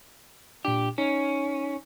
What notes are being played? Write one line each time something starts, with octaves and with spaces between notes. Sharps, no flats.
A#2 D4 G4
C#4 D#4